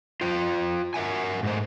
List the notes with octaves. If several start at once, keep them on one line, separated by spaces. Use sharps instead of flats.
F4 C5 G5
A#4 B4 E5 F#5 G#5
G#2 A3 C5